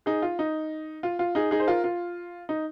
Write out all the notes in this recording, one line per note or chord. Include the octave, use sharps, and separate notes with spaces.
D#4 G#4
F4
D#4
F4
F4
D#4 G#4
D#4 G#4
C5
F4 A#4
F4
D#4